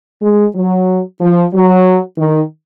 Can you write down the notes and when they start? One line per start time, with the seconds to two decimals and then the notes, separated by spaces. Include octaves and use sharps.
0.21 G#3
0.54 F#3
1.20 F3
1.53 F#3
2.17 D#3